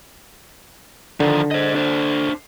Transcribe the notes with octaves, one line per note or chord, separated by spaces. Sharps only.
D3 D#3 F3
C5 D#5
D4 C5